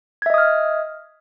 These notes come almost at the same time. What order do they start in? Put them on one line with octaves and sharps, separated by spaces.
G#6 E5 D#5 D#6 F6